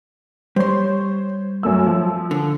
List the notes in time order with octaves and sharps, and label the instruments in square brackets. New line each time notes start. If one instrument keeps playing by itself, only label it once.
[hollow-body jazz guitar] G3 C6 [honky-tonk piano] C5 C#5
[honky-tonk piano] F#2 A3 E6
F3
[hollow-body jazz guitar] D3